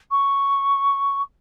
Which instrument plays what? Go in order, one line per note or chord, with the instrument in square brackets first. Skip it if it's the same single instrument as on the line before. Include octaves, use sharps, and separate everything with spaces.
[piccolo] C#6